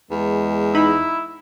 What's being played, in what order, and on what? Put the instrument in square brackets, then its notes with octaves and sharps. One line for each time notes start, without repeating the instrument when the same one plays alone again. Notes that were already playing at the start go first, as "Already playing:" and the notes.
[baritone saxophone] E2 [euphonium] G#3
[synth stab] D#4 B5 [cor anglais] E4